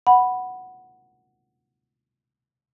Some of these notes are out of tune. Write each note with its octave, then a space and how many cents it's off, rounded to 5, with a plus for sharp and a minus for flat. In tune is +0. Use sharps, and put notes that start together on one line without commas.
F#5 +0 B5 -5